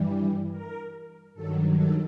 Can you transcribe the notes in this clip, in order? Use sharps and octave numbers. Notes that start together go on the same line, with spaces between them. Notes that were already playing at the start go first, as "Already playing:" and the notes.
Already playing: G2 E3 G3
A#4
G2 D#3 F#3 A4
A4